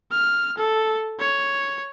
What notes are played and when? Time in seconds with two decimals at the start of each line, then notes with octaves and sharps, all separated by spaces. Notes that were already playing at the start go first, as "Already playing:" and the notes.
0.12 F6
0.58 A4
1.20 C#5